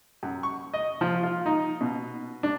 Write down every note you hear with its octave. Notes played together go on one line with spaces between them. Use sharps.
F#2
C#6
D#5
F3
F4
D#4
B2
D4